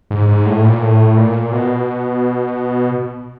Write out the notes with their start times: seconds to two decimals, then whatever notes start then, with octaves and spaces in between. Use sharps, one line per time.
0.11 G#2
0.28 G#2
0.46 A2
0.64 A#2
0.81 A2
1.17 A#2
1.52 B2